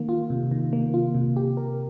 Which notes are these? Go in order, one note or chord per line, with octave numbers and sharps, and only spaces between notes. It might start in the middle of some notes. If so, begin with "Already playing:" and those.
Already playing: D#3 A#3
F4
C3
D#3
A#3
F4
C3
G4
A#4